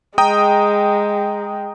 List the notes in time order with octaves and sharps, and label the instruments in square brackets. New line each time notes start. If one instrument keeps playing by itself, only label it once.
[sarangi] G#3 [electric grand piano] G5 A#5 D#6